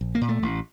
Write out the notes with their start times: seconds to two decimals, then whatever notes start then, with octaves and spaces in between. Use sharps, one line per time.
0.01 A#1
0.15 A#3
0.21 A#2
0.29 A3
0.42 A1